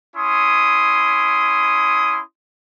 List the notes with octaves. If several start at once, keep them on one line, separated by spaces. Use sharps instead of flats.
C#4 E4 C6 D#6